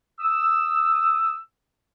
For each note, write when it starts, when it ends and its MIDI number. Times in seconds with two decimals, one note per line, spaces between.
0.20 1.37 87
0.20 1.37 88